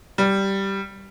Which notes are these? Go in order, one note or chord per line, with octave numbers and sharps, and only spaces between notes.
G3